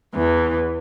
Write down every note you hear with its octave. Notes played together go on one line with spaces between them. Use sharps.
E2 E3